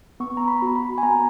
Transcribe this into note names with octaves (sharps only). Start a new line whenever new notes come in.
B3 C#6
A#5
B5
F#4
B5
G#5
B3 A#5